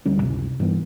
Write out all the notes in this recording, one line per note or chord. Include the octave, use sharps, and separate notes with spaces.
D2 G3 C#4
C#2 F#2 C3
G2 E3 B3